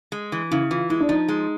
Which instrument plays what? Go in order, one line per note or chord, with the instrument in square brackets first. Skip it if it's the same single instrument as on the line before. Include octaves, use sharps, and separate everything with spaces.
[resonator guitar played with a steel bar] G#3
E3
[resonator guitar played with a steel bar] C#3 [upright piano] E4
[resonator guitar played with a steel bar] E3 [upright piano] F4
[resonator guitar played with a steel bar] G#3 [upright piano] E4
[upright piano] D4
[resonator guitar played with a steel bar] F3 [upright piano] D#4
[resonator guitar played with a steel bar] G#3